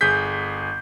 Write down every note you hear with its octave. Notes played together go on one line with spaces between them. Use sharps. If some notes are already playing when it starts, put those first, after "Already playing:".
G1 G#4 G6 B6